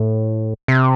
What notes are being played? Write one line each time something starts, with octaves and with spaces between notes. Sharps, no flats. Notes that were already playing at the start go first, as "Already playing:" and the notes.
Already playing: A2
C3